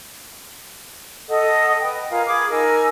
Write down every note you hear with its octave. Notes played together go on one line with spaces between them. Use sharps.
A4 D#5 F#5 D#6
B4 D#5 G5
F4 A#4 F5 G#5
G#4 B5 D6 D#6
D#4 A#4 G#5 E6